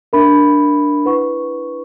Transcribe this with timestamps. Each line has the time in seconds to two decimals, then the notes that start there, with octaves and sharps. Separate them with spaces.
0.13 D4 A#4 E5 B5
1.05 E4 B4 F#5 C#6